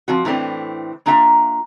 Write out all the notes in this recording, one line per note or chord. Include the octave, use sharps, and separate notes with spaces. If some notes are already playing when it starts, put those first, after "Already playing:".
F3 C4 F#4
A2 E3 A3 C4 D4
A#3 D4 F4 E5 F#5 A#5